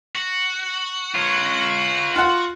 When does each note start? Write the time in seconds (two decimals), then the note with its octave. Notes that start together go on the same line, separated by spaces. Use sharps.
0.15 F#4
1.15 F4 C#5
2.16 F4 F#5